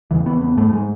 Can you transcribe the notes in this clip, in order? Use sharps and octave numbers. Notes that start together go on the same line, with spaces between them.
E2 C#3 E3
B3
B3
G#2 A3
G#3